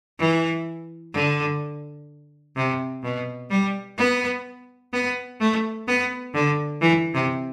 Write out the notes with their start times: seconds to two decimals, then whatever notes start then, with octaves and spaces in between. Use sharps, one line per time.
0.19 E3
1.14 D3
2.56 C3
3.03 B2
3.50 G3
3.98 B3
4.93 B3
5.40 A3
5.87 B3
6.34 D3
6.81 E3
7.14 C3